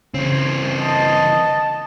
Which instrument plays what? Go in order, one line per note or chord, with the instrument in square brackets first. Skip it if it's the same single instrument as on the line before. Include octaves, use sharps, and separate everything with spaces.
[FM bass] C#3 [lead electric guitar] E3 C4
[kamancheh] D#5 [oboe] A5